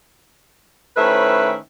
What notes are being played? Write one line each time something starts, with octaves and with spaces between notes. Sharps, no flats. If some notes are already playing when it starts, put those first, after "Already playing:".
A2 D#3 C#4 B4 C5 E5